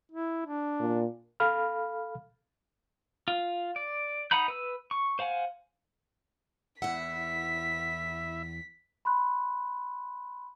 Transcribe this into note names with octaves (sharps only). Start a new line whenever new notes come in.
E4
D4
A#2
A4 F5 B5 F6
F4
D5
D#4 F#5 A#5 B5 G6
B4 E6
C#6
C5 F5 F#5 G#5
E2 E4 E5 F#5 B6
B5 C6 F#6